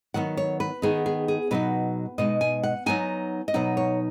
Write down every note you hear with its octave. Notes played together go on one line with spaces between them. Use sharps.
D#3 F#3 B3 F#5
C#5
B4
D#3 B3 D#4 G#4
G#4
G#4
B2 F#3 D#4 B4
B2 G#3 D#4 D#5
G#5
F#5
F#3 B3 D#4 G#5
D#5
B2 F#3 D#4 F#5
C#5